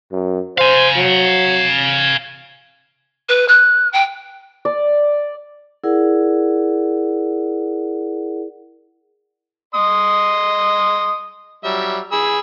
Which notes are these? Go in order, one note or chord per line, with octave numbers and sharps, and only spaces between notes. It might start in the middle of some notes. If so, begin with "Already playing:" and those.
F#2
C5 F5 G#5
F#3
B4
F#6
G5
D5
E4 G#4 A#4 D5 F#5
D#5 C6 D#6
F#3 G3 E5
G#4 B5 E6